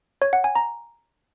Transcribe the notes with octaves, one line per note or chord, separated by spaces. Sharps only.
C#5
F#5
G#5
A#5